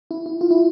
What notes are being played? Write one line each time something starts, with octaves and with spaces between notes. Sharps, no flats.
E4
E4
F4
E4